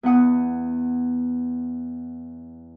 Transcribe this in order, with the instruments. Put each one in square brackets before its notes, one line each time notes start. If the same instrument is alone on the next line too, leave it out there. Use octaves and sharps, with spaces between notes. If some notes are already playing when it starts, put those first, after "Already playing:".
[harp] E2 B3 F#5 D#6